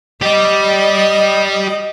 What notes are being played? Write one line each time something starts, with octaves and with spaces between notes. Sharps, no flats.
G4 D5 D#5